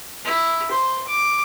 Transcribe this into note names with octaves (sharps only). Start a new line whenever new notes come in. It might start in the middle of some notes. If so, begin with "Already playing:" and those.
E4
C5
D6